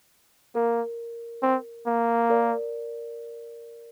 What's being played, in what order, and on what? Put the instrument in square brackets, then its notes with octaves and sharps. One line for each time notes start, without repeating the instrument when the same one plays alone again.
[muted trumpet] A#3 [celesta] A#4
[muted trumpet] C4
A#3
[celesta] A#4 D5